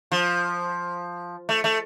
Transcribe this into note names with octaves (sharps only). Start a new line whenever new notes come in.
F3
A3
A3